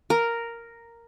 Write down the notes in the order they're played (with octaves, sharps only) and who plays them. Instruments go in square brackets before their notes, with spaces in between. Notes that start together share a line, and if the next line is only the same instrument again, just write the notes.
[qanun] A#4